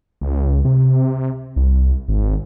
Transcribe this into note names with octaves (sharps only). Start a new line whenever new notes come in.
C#2
C3
C2
G#1